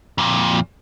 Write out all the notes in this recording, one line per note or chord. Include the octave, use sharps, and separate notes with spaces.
F2 A#2